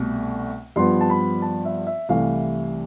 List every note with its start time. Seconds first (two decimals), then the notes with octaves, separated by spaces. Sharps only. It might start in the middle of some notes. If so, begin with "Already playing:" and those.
Already playing: C2 B2 A3
0.76 G2 F3 B3 C6
1.01 A5
1.10 B5
1.42 A5
1.65 E5
1.87 E5
2.09 C2 C3 E3 A3 F5